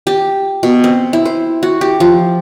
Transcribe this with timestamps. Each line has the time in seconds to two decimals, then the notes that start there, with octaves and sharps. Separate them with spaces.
0.07 G4
0.63 B2
0.84 C4
1.13 E4
1.25 C5
1.63 F#4
1.81 G4
2.00 F3